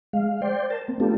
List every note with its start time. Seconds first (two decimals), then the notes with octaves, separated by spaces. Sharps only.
0.13 G#3 F5
0.42 C5 D5 G5 C6
0.70 A#4 A5
0.88 A#3 C4
1.00 A3 B3 D4 F4 G4 A4